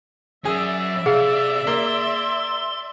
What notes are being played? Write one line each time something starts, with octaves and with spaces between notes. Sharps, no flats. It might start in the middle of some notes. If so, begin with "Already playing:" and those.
F#3 C#4 G#4 D5 E5
C3 G#4 F5
A#3 C6